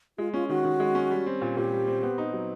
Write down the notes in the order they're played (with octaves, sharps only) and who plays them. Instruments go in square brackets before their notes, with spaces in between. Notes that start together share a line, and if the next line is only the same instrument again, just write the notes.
[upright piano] G#3 [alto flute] F4
[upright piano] C#4 [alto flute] F4
[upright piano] D#3 [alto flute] F#4
[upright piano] D#3
G#3
C#4
G3
C4
A#2
[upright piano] A#2 [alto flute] G4
[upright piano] G3
C4
B3
D#4
F#3